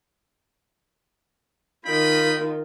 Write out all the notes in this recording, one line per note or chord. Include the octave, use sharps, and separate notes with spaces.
D#3 F4 D#5 G5 B5